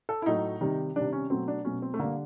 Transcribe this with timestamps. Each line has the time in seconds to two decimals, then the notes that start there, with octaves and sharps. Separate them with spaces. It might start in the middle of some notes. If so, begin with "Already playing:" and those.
0.09 A4
0.22 E4
0.26 A2 F#3 A3 D#4
0.61 C3 D#3 G3
0.96 C3 D#3 G3 D4
1.13 C#4
1.30 B2 F#3 A3 C4
1.48 D4
1.64 B2 F#3 A3 C#4
1.82 C4
1.94 A3
1.99 D3 G3 A#3